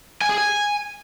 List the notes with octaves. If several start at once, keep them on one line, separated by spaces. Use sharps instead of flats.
G#5
G#4
G#5